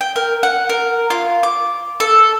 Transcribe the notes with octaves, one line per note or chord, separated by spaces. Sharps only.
G5
A#4
F#5
A#4
F4
D6
A4